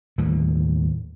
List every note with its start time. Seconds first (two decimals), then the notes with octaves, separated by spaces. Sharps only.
0.18 D#2 A2 D3 G3